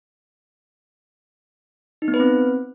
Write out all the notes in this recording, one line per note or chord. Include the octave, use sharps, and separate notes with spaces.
D#4
B3
B4
C4